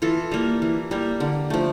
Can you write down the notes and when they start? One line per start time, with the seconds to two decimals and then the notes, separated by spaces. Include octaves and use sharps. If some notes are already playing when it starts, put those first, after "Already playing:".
0.02 E3 F4 A4
0.32 G3 A#3
0.62 E3
0.91 G3 A#3
1.20 D3
1.50 F3 A3